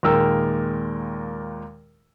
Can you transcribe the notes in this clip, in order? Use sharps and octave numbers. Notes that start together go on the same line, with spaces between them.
D#2 A#2 G#3 A#4 G5 E6